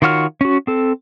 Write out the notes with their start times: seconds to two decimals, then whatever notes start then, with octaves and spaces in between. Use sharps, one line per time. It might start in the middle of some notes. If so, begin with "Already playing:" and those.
0.02 D#3 F4 F#4 C#5 F6
0.41 C#4 F#4
0.67 C4 A4